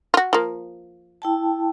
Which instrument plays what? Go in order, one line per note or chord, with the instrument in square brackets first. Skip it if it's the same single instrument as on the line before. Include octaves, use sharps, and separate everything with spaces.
[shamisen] F4 F#4
F3 A#3
[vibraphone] E4 G5 A5